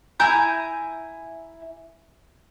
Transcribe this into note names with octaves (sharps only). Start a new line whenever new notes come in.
E4 G#5 A#5 G6